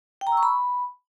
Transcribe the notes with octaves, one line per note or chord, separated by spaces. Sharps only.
G5
A#5
E6
C#6
B5